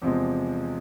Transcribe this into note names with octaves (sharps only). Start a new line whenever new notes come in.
E2 C3 F3 G#3